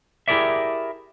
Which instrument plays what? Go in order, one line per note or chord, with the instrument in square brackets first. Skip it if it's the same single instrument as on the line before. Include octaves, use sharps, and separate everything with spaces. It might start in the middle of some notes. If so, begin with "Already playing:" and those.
[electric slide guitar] E4 G4 G#4 A#4 D5 E5